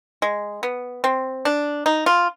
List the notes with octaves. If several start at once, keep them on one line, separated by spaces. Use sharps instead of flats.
G#3
B3
C4
D4
D#4
F4